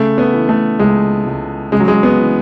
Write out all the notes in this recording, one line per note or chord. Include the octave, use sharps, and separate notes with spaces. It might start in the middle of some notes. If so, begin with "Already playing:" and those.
Already playing: C#3 A3
B3
E3
A3
C#2 G#3
C#2
C#3 G#3
F#3
G#3
B3
E3